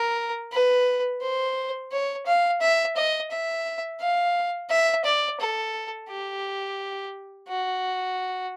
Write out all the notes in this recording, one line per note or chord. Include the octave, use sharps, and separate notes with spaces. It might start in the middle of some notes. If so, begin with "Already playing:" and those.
Already playing: A#4
B4
C5
C#5
F5
E5
D#5
E5
F5
E5
D5
A4
G4
F#4